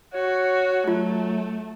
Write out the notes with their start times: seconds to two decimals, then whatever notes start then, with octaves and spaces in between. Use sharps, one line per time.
0.14 F#4 C#5
0.88 F#3 A3 F4